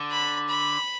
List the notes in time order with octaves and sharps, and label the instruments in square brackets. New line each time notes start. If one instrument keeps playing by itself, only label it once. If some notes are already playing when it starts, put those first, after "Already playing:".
Already playing: [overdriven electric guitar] D3
[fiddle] B5
B5